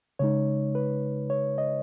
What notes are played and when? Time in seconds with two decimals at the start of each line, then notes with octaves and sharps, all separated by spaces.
0.19 C#3 G#3 D#4 C#5
0.75 B4
1.30 C#5
1.58 D#5